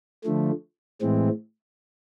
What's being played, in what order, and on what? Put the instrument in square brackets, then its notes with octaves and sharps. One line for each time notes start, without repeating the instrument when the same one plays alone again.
[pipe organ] D3 F3 A3
A2 E3 G#3 C4